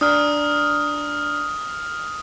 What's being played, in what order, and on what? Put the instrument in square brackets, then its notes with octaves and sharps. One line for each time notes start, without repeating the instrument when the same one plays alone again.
[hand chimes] D4 D5 A#5 [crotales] D#6 F6